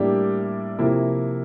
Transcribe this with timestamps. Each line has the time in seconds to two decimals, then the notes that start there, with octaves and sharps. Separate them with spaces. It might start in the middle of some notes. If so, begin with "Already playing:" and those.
Already playing: A2 G3 A#3 D4 G4
0.78 C3 F3 A#3 E4